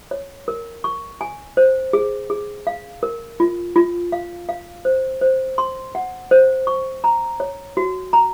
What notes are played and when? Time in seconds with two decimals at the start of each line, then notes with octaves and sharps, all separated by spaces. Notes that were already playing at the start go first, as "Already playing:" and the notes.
0.11 C#5
0.48 A#4
0.84 C#6
1.21 G#5
1.57 C5
1.93 G#4
2.30 G#4
2.67 F5
3.03 A#4
3.40 F4
3.76 F4
4.12 F5
4.49 F5
4.85 C5
5.21 C5
5.58 C6
5.95 F#5
6.31 C5
6.67 C#6
7.04 A#5
7.40 C#5
7.77 F#4
8.13 A#5